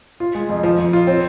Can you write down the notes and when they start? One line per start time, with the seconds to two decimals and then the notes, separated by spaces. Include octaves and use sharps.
0.20 F4
0.35 G#3
0.49 F2
0.63 F3
0.79 F2
0.93 F4
1.07 C4